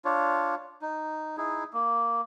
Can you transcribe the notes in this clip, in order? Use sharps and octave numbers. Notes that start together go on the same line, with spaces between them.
D4 F4 C#5
D#4
D#4 E4 G#4
A#3